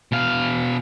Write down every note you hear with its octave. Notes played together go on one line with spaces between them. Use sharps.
B2 F5